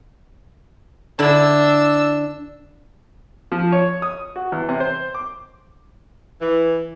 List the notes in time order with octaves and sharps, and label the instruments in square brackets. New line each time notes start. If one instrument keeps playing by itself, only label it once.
[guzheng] D3 E4 [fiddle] D4 E6
[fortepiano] F3
C#5
D#6
F#4
E2
C3
C5
D6
[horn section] E3